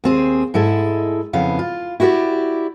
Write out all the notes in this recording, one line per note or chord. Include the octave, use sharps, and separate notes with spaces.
D#2 C4 G#4
G#2 G#3 E4 A4
F2 C#3 B3 E4 F5
F4
E4 F#4 G4 A#4 D5